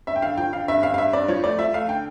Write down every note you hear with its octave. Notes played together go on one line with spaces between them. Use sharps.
G2 E5
G5
D3 F5
F3 G5
D3 F5
G2 E5
G2 F5
F5
G2 E5
G2 D5
F3 C#5
A3 D5
F3 E5
A3 F5
D3 G5